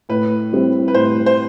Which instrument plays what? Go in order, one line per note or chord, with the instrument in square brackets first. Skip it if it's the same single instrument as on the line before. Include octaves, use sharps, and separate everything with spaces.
[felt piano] A2 [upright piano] B4
[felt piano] G3 C4 E4
[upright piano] B4
[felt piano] A2 [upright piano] C5
[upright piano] C5